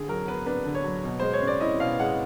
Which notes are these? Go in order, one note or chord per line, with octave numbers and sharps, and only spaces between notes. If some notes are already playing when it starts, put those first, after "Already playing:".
Already playing: D3 G#4
F#3 A#4
B3 B4
D4 B4
D3
C#5
F#3
B2
G#3 C5
C#5
C#4
D5
E4 D#5
B2 F5
G#3 F#5